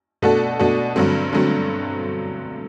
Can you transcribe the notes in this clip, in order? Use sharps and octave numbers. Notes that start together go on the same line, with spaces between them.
B2 A3 D4 F#4 A4
B2 A3 D4 F#4 A4
G2 D3 F#3 A3 C4
D3 F#3 A3 C4